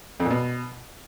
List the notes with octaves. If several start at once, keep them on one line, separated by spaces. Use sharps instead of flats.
F2
A#2
B2